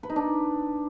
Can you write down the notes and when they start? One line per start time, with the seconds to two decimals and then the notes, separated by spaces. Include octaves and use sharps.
0.03 B4
0.10 D#4
0.16 D4